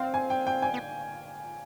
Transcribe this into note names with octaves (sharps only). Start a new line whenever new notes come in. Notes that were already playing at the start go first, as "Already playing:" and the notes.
Already playing: C4 F5
G#5
G5
G5
G#5
B3